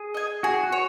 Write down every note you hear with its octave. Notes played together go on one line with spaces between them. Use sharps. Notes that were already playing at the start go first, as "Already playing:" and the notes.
Already playing: G#4
D#5 G#5
F#4 G#4
F#4
C#5